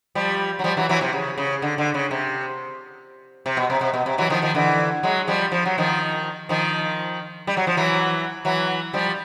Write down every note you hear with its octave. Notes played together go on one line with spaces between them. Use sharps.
F3 G3
F#3
F3 G3
E3 F#3
E3 F#3
C3
C#3
C#3
D3
D3
C#3
C3
C3
B2
C3
C3
B2
C3
E3 F#3
D#3 F3
D#3 F3
D3 E3
F#3 G#3
F3 G3
F3
F#3
D#3 F3
D#3 F3
G3
F#3
F3
E3 F#3
E3 F#3
F3 G3